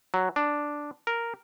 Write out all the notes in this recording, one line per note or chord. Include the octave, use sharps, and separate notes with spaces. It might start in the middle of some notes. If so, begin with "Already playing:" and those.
F#3
D4
A#4